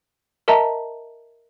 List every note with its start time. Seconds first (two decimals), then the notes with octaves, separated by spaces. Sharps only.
0.48 A#4 D#5 E5 A5 A#5